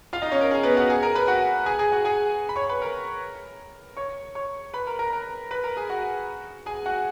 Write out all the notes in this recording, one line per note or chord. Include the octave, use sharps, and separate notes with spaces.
F4 F5
D#4 D#5
C#4 C#5
A#4
G#4
B3 B4
F#4 F#5
G#4 G#5
A#4 A#5
B4 B5
F#4 F#5
G#4 G#5
G#4 G#5
F#4 F#5
G#4 G#5
B5
C#5 C#6
B4 B5
A#4 A#5
C#5 C#6
C#5 C#6
B4 B5
A#4 A#5
A#4 A#5
A#4 A#5
B4 B5
A#4 A#5
G#4 G#5
F#4 F#5
G#4 G#5
F#4 F#5